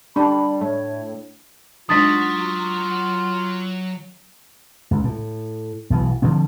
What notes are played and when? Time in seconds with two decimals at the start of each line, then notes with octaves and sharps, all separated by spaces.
0.16 G3 D4 B5
0.61 A2 C#5
1.89 F#3 G#3 D4 D#4 F4 D#6 A6 B6
4.91 C#2
5.04 A2
5.90 B1 B2 E3
6.22 D3 F3 C4